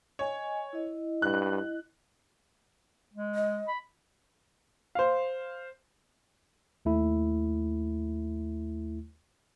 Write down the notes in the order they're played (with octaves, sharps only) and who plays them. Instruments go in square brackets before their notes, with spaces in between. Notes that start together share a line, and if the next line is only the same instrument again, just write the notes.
[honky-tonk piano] C#5 [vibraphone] D#5 G#5
[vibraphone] E4 D#5
[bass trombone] G2 [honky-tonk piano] F#6
[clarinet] G#3
[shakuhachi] D#5
[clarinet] B5
[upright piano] C5 F5
[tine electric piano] D#2 A3 E4